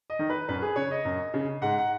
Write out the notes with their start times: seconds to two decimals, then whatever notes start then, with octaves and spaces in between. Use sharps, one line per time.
0.10 D#5
0.19 D#3
0.30 B4
0.48 F#2 B4
0.62 G#4
0.76 C#3 C#5
0.91 D#5
1.05 F#2
1.34 C#3
1.62 G#2 F#5
1.78 F#5